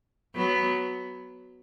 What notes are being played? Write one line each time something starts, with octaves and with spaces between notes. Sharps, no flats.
F#3 B3